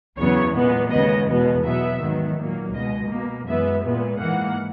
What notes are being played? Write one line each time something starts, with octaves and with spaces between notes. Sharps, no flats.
E2 C#3 F#3 B3 C#5
A#2 G#3 B3
D#2 C#3 G#3 B3 D#5
E2 B2 G#3 B3
B2 F#3 B3 E5
G#2 D#3 F#3 B3
A#2 F#3 A#3
C#2 B2 G#3 D#5
B2 A#3
F#2 E3 G#3 B3 E5
A#2 G#3 B3
G#2 E3 A#3 F#5